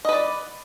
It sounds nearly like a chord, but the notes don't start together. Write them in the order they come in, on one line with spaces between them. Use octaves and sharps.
D#5 B4 D5